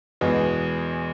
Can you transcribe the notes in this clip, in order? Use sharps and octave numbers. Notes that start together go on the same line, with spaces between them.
E2 B2 G#3 B3